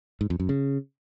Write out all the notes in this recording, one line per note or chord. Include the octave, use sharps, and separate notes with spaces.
G#2
F2
F#2
C#3